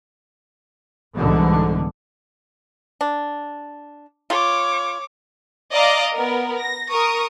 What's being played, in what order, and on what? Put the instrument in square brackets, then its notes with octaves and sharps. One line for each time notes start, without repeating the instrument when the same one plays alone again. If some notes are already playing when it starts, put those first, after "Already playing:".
[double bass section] C2 G#2 B2 D3 E3
[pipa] D4
[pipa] F4 [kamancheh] C#5 D6
[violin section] D5 D#5 F5 A#5 D6
B3 A#4
A#6
A#4 C#6 D#6